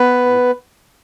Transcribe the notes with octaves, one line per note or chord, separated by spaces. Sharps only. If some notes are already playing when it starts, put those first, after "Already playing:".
Already playing: B3 B4
A2